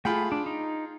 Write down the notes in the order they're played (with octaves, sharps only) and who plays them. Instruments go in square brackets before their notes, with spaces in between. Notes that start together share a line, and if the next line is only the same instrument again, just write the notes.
[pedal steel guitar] A3 B5 [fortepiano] F4 G#4 G5
[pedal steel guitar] D4
D#4